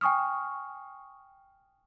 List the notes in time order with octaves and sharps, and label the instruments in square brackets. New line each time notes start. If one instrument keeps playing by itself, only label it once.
[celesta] G5 G#5 C#6 D#6 F6